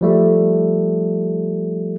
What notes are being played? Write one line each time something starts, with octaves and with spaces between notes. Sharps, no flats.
F3 G3 A3